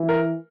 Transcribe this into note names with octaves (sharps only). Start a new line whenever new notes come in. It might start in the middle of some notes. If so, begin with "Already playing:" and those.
Already playing: E3
A#4